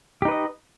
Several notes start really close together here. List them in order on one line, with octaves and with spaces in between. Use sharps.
G4 D#4 B4 D#5